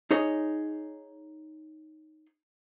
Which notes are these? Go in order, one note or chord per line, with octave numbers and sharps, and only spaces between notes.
D#4 G#4 C#5 D#5